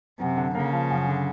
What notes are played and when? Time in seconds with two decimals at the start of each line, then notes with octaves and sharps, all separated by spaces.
0.20 F#2 C3
0.37 D3
0.55 C#3 A#3
0.73 F3
0.91 F#2
1.09 D3